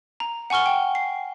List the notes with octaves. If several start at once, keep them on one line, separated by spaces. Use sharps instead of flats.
A#5
F#5 G#5 C#6 F6 G7
G5
C7